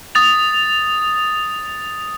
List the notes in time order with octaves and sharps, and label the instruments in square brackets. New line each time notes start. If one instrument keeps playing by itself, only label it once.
[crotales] D#6 A6 F7